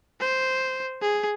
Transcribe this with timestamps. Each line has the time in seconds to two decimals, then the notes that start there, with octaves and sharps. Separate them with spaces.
0.20 C5
1.02 G#4